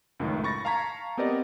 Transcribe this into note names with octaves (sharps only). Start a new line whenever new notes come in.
C#2 F#2 A2 D#3
B5 C#6 A6 A#6
F5 A5 A#5 C#6 G#6 B6
B3 C4 G4 A#4 D5 D#5